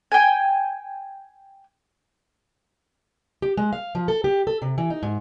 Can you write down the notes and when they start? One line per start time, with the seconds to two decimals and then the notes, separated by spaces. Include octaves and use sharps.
0.12 G5 G#5
3.42 G4
3.57 G#3
3.73 F5
3.95 F3
4.08 A4
4.24 G4
4.47 A4
4.62 C3
4.78 E3
4.90 D#4
5.03 G#2